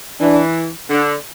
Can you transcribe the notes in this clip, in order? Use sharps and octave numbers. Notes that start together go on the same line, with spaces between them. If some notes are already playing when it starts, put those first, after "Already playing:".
E3 D4
D3 D4